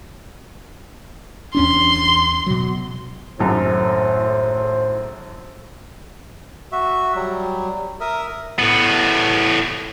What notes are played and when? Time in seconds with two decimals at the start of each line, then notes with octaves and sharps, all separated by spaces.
1.55 E2 C#4 D4 C6
2.47 B2 F#3
3.40 G#1 F#2 A2 C5
6.72 F#4 E5
7.15 F#3 G3
8.00 A#4 E5 D#6
8.59 A2 B3